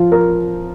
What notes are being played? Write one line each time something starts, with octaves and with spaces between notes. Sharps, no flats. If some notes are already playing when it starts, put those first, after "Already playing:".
Already playing: F3 F4
A#4